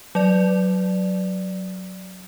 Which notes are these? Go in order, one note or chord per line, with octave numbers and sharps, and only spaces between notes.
F#3 D5